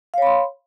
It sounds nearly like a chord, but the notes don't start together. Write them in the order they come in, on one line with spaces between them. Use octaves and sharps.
F5 C#5 B5 C6